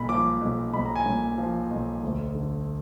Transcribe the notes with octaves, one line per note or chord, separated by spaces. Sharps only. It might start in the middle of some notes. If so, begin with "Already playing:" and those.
Already playing: B1 A#2 B5
F3 D6
B1
B1 B5
A#5
G#5
A#2
F3
B1
D2
D3